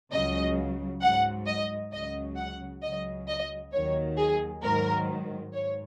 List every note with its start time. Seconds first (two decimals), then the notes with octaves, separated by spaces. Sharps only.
0.11 C#2 C#3 F#3 D#5
1.01 G#2 F#3 F#5
1.46 D#5
1.91 C#2 C#3 F#3 D#5
2.37 F#5
2.82 C#2 C#3 F#3 D#5
3.28 D#5
3.72 D#2 D#3 F#3 C#5
4.17 G#4
4.63 G#2 D#3 F#3 A#4
5.53 G#2 C#5